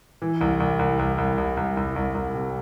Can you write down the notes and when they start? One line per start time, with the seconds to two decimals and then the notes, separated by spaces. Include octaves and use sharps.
0.22 E3
0.41 C2
0.60 C2
0.79 C2
0.99 C2
1.18 C2
1.38 C2
1.57 C2
1.77 C2
1.96 C2
2.15 C2
2.34 C3